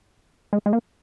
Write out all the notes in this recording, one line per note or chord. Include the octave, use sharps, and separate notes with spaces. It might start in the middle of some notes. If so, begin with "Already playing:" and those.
G#3
G#3
A#3